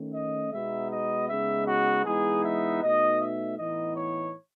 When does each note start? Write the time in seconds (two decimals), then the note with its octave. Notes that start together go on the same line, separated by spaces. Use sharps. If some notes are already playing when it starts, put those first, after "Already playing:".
Already playing: D#3 A3 C#4
0.14 D#5
0.53 B2 G#3 B3 D#4 E5
0.91 D#5
1.29 C#3 G#3 B3 D#4 E5
1.67 F#4
2.05 E3 G#3 B3 D#4 G#4
2.43 E5
2.82 B2 A3 D#4 D#5
3.20 E5
3.58 A2 E3 B3 D#4 D#5
3.96 C#5